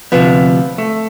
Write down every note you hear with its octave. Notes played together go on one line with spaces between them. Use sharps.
D2 C3 F3 B3
A3